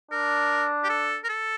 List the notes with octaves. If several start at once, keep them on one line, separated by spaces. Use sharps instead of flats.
D4 A#4
G4
A4
A#4
A4